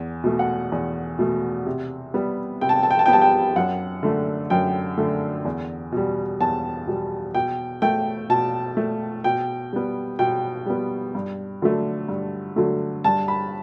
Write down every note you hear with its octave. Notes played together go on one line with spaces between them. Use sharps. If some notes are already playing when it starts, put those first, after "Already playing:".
Already playing: E2
B2 A3
F#5
E2
B2 A3
C3
G3 B3
C3 G5
A5
G5
A5
G5
A5
B3 G5
G3 A5
G5
F#2 F#5
D3 A3
F#2 G5
D3 A3
E2
B2 G3
E2 A5
B2 G3
B2 G5
A3 G5
B2 A5
A3
B2 G5
G3 B3
B2 G5
G3 B3
G2
D3 F#3 A3
G2
D3 F#3 A3
G2 A5
B5